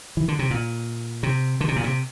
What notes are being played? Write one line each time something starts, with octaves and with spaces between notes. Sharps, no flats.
E3
D3
C3
A#2
C3
D3
C3
A#2
C3